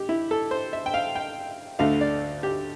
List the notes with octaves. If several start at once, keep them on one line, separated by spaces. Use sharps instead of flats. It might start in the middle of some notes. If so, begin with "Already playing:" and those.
Already playing: G4
E4
A4
C5
E5
G5
F5
G5
D2 D3 A3 F5
D5
G4